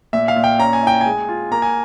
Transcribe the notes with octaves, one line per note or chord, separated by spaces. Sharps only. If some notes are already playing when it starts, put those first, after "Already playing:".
A#2 E5
F5
A#2
G5
C#4 A#5
G#5
E4 G5
G#3 G#5
F4
A#3 A#5
G#5